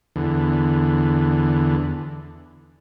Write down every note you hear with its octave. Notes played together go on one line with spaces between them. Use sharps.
E2 D3